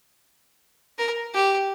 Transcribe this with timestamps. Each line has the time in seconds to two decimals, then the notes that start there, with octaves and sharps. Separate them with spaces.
0.98 A#4
1.34 G4